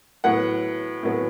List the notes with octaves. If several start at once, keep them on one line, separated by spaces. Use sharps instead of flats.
A2 F#3 B3 F#5
A2 F#3 B3